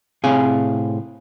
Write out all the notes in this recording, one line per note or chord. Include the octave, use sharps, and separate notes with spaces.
A2 C3 C4 G#4 F5 G#5